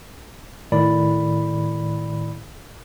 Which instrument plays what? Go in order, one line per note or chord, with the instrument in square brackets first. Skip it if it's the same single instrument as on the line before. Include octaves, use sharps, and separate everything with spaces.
[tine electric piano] A2 D#3 D5 B5